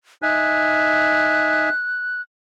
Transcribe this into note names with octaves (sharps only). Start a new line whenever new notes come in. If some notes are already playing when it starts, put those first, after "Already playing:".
D#4 E5 G#5 F#6